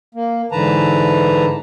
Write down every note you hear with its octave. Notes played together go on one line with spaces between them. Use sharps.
A#3
G#2 D3 E3 B4 A5 A#5